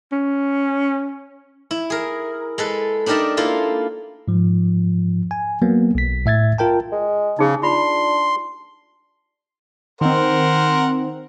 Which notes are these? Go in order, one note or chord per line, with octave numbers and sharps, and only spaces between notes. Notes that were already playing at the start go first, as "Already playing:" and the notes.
C#4
E4
G#4 A#4
G#3 A4 B4
D4 D#4 G4 A#4 D5 E5
A#3 E4 F4 A4 C5
G#2 F3
G#5
F#3 A#3 B3
B1 B6
A2 E5 G#6 A6
F4 A#4 G5 A5
G#3
C#3 D#4 G#4
D4 F4 B5 C6
D#3 C4 A#4 C5 F#5